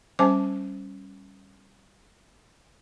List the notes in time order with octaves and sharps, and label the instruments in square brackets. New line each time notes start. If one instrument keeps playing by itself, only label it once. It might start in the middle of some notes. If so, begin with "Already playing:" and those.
[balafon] G3 C#4 C5 G#5 A5 D6